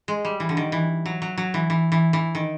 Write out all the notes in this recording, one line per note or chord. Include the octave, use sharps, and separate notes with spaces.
G#3
G3
E3
D3
D#3
E3
F#3
F#3
F#3
E3
E3
E3
E3
D#3